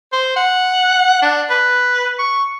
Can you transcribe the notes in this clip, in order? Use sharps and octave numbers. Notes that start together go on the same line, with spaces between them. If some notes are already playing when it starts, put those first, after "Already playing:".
C5
F#5
D4
B4
C#6